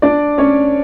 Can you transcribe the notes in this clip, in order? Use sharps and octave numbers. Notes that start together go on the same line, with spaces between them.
D4 D5
C#4 C#5